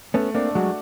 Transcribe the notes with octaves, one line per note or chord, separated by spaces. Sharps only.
A3 B3 C#4
A#3 C4 D4
F#3 G#3 F#4